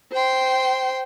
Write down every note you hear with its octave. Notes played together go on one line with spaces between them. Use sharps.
C5 G5 C6